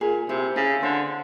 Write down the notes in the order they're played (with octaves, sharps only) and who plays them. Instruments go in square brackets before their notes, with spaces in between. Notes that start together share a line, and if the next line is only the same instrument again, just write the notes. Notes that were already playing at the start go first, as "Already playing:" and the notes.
[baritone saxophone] A#2 [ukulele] G#4
[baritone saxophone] C3 [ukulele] E4
[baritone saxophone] C#3 [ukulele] E4
[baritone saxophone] D3 [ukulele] C5